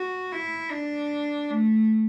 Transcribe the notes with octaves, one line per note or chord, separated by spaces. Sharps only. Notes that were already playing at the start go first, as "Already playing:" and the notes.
Already playing: F#4
E4
D4
A3